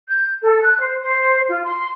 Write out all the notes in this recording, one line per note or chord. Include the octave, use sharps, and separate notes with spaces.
G6
A4
F#6
C5
C5
F4
C6